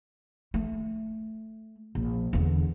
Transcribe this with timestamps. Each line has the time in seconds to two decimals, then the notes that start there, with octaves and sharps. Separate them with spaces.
0.54 A3
1.95 A#1
2.33 E2 D3